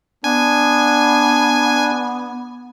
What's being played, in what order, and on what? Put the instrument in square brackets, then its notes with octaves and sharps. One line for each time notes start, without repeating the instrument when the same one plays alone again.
[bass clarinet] B3 [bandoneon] D4 [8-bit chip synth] G#5